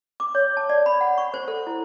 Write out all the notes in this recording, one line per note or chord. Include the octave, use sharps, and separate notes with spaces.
D6
C#5
A5
D5
B5
F#5
C#6
C5
A4
E4